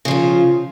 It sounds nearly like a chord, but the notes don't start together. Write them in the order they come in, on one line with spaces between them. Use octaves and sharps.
C#3 F3 F4